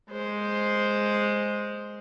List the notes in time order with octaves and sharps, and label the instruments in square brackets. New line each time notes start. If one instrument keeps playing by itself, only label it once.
[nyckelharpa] G#3 C5